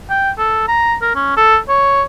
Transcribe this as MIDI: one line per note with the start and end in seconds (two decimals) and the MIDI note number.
0.10 0.31 79
0.38 0.63 69
0.68 0.95 82
1.02 1.14 70
1.15 1.36 61
1.37 1.57 69
1.69 2.03 73